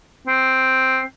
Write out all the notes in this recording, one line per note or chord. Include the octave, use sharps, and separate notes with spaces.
C4